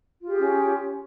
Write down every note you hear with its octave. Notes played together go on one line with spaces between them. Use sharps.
C#4 F4 G4 G#4